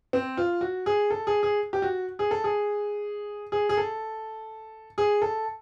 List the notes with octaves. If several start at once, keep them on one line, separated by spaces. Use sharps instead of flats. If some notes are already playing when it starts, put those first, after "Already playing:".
C4
F4
F#4
G#4
A4
G#4
G#4
G4
F#4
G#4
A4
G#4
G#4
G#4
A4
G#4
A4